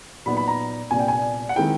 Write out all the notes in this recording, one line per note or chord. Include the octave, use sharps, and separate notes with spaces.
A#2 F#3 B3 D#4 B5
B5
A#5
C2 A#2 G3 B3 D4 G#5
G5
G#5
F#5
D#3 G#3 C4 E4 G5